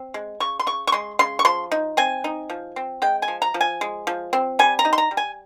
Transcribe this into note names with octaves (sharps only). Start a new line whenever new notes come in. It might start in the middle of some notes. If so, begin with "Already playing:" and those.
Already playing: C4
G#3
C#3 C#6
C6
C#3 C#6
C#6
G#3 C6
C#3 C6
C#6
F3 C6
D#4
C4 G#5
D#4
F3
C4
G#3 G5
G#5
F3
A#5
F3
G#5
G#3
F3
C4
G3 G#5
A#5
D#4
C6
A#5
G3
G#5